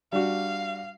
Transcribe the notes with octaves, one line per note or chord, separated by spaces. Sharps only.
G3 D4 F#4 F5